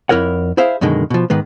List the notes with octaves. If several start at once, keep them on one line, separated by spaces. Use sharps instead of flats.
F2 E4 A#4 C#5 F#5
E4 G#4 C5 E5 F5
F#2 B2 D3 D#3 G#3
B2 F3
G#2 D#3 G#3 B3